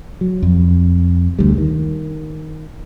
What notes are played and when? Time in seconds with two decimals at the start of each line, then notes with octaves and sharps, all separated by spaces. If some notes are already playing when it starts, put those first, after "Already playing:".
0.21 F#3
0.43 F2
1.39 D2 G3
1.58 D#3